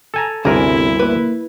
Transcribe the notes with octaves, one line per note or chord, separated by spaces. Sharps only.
A4 G#5 A#5
G1 D2 C3 E4 G#4 A#4
A#3 B4